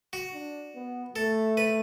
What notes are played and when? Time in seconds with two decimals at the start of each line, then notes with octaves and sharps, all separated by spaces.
0.13 F#4
0.34 D4
0.75 B3
1.16 A3 A4
1.57 B4